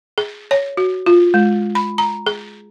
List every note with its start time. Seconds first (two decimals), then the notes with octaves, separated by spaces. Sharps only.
0.18 G#4
0.51 C#5
0.77 F#4
1.06 F4
1.34 G#3
1.75 B5
1.98 A#5
2.27 G#4